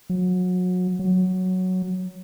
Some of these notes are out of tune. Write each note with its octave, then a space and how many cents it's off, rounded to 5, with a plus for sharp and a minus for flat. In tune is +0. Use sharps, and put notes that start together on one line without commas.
F#3 -30
F#3 +0